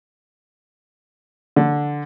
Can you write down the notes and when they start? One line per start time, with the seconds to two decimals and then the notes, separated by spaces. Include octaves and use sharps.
1.56 D3